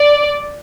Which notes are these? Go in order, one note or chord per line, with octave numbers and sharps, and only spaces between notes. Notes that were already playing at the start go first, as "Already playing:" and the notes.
Already playing: D5